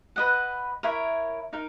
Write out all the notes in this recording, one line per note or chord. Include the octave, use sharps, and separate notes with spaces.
B4 D#5 F#5
E4 A#4 C#5 E5
D#4 A#4